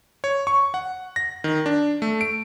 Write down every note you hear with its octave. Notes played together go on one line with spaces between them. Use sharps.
C#5
C#6
F#5
A#6
D#3
D4
A3
D7